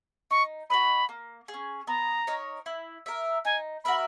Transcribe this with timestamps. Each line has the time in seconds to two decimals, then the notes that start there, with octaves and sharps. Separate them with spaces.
0.31 D#4 C#6
0.70 F#4 B4 D#5 B5
1.09 A#3
1.48 G#4
1.54 C#4
1.87 B3 A#5
2.27 D#4 A#4 C#5
2.66 E4
3.06 A#4 E5
3.45 D#4 G#5
3.84 F#4 A#4 E5 B5